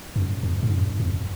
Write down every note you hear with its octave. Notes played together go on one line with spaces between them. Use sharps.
F#2
F2
G#2
F#2
F2